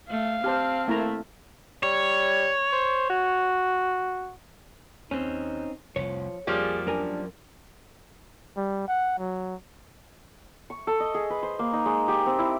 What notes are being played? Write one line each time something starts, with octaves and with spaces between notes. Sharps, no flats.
A3 F5
C4 G4 C5 A5 F6
A3 A#3 E4 A#5
G3 C#5
C5
F#4
D#2 C4 C#4 D#4
F1 C2 F3 C#5
F2 F3 G3 A#3 G#4
F#2 D4 A#4 G#5
G3
F#5
F#3
C#6
A4
D#5
G#4
B4
C5
A#3
D#4
G#3
G4
C4
E4